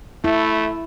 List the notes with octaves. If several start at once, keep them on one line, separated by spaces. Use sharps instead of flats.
A3 E4